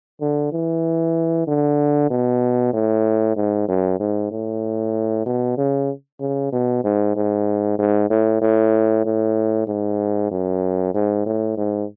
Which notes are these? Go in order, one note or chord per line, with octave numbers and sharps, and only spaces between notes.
D3
E3
D3
B2
A2
G#2
F#2
G#2
A2
B2
C#3
C#3
B2
G#2
G#2
G#2
A2
A2
A2
G#2
F#2
G#2
A2
G#2